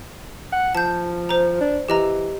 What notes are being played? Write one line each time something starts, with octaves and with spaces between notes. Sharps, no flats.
F#5
F3 A5 G6
C5 A#5
D4
E3 G4 D#5 A#5